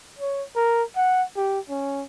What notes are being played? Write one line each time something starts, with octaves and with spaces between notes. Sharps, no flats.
C#5
A#4
F#5
G4
C#4